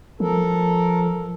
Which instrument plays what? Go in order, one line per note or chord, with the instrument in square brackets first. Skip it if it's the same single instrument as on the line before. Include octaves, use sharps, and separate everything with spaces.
[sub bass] F3 [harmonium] A4 A#4